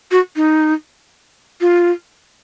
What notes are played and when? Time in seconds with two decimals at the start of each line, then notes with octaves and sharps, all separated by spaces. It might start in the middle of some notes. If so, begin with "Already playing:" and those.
0.11 F#4
0.36 D#4
1.61 F4